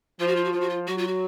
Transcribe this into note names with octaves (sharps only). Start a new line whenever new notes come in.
F3 F4
F#4
F4
F#4
F3 F4
F#4
F4
F#3 F#4
F4
F#4